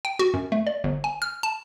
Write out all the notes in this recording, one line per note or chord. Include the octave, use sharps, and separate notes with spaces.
G5
F#4
F#2
A3
D5
G1
G#5
F6
A5